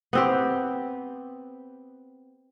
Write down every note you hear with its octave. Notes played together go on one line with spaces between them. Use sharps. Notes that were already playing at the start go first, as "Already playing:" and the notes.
B3 C4 G4